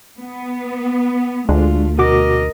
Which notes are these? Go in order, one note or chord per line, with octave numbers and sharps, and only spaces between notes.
B3
D2 G#3 A3 D4 F4
B2 F#4 A#4 D#5 D6